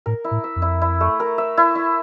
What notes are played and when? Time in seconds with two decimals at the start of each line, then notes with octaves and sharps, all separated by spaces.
0.06 A2 A#4
0.24 E4
0.31 A2
0.44 E5
0.56 F2
0.62 E4
0.82 E4
1.01 A3
1.20 A#4
1.38 E5
1.57 E4
1.75 E4